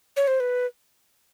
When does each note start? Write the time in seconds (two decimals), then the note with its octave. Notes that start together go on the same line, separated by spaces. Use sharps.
0.17 C#5
0.27 C5
0.40 B4